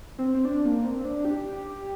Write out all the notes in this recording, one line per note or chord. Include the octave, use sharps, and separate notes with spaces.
C4
C4
D4
A#3
C4
D4
G4